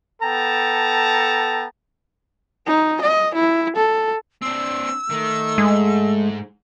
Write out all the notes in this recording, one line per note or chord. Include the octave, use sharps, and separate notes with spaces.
B3 A4 G5 A5 A#5
D#4
D#5
E4
A4
C4 D4 E6
D#3 A3
G#2 G#3